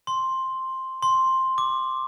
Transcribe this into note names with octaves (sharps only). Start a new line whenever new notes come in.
C6
C6
D6